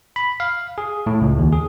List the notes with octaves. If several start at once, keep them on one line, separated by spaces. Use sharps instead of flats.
B5
F5
G#4
A2
C#2
D#2
G#4